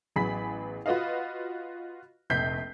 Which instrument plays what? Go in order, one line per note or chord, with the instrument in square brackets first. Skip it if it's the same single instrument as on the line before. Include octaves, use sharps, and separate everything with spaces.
[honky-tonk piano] A1 F#3 B3 G#4 B5 B6
F4 F#4 B4 D#5 F5
F1 A#1 G6 B6 C7